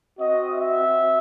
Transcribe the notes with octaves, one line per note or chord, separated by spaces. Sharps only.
C4 F#4 D#5
E5
C4 F#4